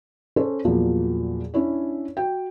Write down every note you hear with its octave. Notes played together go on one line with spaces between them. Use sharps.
C#4 A4 C5
E2 A#2 F3 F#3 A#3
C#4 D4 E4 C#5
F#4 G5